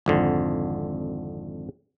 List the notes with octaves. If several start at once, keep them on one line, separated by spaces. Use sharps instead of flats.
G#1 F2 D3